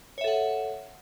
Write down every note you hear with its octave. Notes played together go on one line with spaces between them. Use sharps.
A4 C#5 E5 F#5